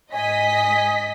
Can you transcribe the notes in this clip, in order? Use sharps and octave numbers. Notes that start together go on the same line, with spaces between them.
G#2 D#5 G#5 B6